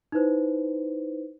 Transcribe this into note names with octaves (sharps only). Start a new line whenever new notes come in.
D#4 E4 B4 C5